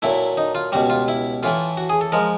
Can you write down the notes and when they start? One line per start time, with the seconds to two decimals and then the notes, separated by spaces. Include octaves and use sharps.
0.02 A#2 F#3 A3 E4
0.37 D#4
0.55 F4
0.72 C#2 B2 G3 F#4
0.90 F4
1.08 E4
1.43 A2 E3 A3 F4
1.77 F#4
1.89 G#4
2.01 A4
2.12 F3 G#3 A#4